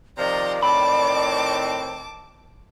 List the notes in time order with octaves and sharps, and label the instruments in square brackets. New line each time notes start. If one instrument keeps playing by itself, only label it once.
[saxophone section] C3 D#3 F3 [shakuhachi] D5 [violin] A#5 C6
[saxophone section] A2 D#3 C4 [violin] A5 D6 [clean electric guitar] B5